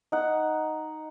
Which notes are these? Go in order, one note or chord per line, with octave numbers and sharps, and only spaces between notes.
D#4 F#5